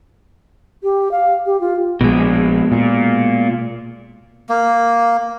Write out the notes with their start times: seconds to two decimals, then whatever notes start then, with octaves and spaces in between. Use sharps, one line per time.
0.83 G4
1.11 F5
1.46 G4
1.61 F4
2.01 A#1 B2 G#3
2.72 A#2
4.49 A#3